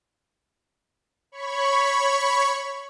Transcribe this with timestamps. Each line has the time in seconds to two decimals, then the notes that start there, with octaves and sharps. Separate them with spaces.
1.32 C#5 B5 C#6